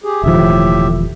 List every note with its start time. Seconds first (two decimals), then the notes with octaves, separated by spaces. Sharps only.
0.04 G4 G#4
0.24 E1 A2 D#3 F3 G4 E5